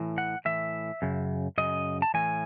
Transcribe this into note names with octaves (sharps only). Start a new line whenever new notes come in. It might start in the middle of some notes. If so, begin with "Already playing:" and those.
Already playing: A2 E3
F#5
A2 E3 E5
F#2 C#3
F#2 C#3 D#5
A5
A2 E3 G#5